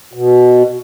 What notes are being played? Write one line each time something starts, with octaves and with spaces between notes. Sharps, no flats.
B2